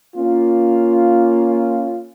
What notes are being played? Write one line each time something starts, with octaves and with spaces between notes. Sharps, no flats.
A#3 C#4 F4